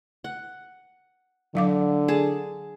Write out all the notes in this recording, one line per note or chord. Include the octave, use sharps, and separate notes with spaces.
F#5
D3 F#3 F5 D6
G#4 A5